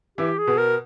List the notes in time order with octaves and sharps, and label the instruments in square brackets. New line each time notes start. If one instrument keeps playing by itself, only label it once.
[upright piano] E3 E4 [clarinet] G4
[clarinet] G#4
[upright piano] B2 B3
[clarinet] A#4